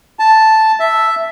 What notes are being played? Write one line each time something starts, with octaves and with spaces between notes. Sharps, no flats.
A5
E5